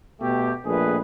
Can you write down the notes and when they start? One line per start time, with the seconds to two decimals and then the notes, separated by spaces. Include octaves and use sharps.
0.21 B2 A3 G4
0.65 A#1 F2 A3 G#4 B4